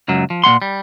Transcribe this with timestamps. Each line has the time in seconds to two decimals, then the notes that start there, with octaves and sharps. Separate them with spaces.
0.08 C#2 F#2 F#3
0.30 F3
0.44 A#2 A3 F#5 C6
0.62 G3